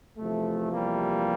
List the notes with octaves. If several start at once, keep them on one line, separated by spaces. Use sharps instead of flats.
E2 C3 F3 A3
G3 A#3